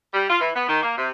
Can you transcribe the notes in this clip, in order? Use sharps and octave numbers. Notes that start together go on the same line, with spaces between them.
G3
F4
E3
B3
D#3
A#3
C3